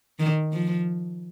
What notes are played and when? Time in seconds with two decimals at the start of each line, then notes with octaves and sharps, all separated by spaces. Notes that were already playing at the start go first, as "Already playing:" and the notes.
0.19 D#3
0.53 F3